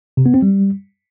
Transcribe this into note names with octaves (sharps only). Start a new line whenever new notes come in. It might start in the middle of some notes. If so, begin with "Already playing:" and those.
C3
B3
C4
G3